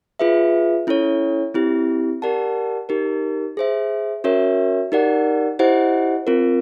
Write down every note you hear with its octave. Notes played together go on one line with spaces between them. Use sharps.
F4 G#4 B4 E5
C#4 E4 A4 C#5
C4 E4 G4
G4 A#4 D5 F#5 A5
D#4 G4 A#4
G#4 C5 E5
C#4 F#4 A#4 C#5 E5
D#4 G4 A#4 D5 F#5
E4 G4 C5 D#5 F#5
C4 F4 A#4